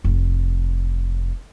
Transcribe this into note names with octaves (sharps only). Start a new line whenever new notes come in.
F1